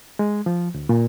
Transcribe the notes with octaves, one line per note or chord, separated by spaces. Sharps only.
G#3
F3
D2
A#2